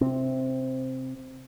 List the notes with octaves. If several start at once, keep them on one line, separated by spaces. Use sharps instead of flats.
C3 C4